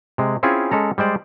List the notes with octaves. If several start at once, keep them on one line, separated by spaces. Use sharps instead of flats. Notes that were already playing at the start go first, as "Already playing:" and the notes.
C3 G#3
C4 C#4 E4 F4 G#4 G#5
G#3 C#4 A4 A#5
G3 G#3 C5 D5